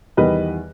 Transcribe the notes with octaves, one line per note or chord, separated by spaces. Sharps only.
E2 D#3 G3 B4 D#5